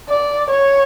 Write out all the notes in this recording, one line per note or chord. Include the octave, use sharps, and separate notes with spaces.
D5
C#5